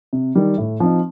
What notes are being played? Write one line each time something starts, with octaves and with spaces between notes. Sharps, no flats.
C3
D#3 G3
A2
F3 C4 D#4